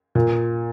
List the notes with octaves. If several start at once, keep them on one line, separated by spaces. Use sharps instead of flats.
A#2